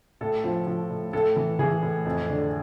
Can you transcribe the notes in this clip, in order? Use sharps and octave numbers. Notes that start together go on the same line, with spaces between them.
A2 A4
F3
F3
A2
A2 A4
E3
E3 G#4
A2
F2
D3